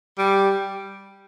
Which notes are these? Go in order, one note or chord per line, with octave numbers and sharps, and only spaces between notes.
G3